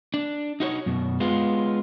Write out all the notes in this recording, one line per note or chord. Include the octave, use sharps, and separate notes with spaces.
D4
D#4 F#4 C5 C#5
F#2 B2
G#3 B3 F4